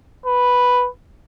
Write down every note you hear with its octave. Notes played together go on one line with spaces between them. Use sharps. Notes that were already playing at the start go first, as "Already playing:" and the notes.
B4